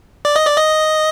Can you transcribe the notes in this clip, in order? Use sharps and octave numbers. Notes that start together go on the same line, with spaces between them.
D5
D#5
D5
D#5